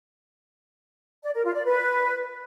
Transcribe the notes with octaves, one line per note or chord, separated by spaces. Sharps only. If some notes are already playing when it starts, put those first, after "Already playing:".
D5
A#4
F4
D5
B4